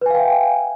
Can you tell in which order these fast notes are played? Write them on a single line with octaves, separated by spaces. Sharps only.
B4 G#5 F5 G5 E5